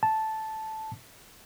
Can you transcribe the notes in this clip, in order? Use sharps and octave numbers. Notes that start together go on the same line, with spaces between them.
A5